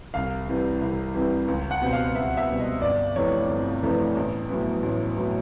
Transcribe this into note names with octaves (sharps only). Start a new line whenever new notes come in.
C2 F5
C3 E3 G3
C2
C3 E3 G3
C#2
F#5
B2 G3 C4
F5
C#2 E5
E5
B2 G3 C4
D#5
G1 D5
F2 C3 E3 A3 C#5
G1
F2 C3 E3 A3
A1
A2 F#3 B3
A1
A2 F#3 B3